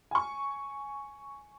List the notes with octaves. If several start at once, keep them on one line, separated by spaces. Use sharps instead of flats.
G#5 C#6